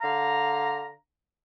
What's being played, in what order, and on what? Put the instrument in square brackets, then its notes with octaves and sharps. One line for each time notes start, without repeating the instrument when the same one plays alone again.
[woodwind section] D3 F5 A#5